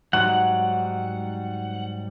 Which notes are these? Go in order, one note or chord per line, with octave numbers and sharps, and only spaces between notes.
G#2 F#3 G3 F#5